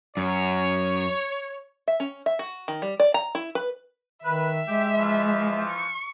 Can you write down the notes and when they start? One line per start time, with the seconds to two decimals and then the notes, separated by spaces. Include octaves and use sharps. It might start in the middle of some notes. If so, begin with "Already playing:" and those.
0.17 F#2 C#5
1.88 E5
2.00 C#4
2.26 E5
2.39 F#4
2.68 D#3
2.82 G3
3.00 D5
3.14 A#5
3.35 E4
3.55 B4
4.24 D#3 B4 E5
4.68 G#3 G4
4.96 E3 F3
5.70 C#6